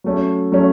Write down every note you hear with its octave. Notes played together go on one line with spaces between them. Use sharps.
F#3 A3 C#4
F#3 A3 C#4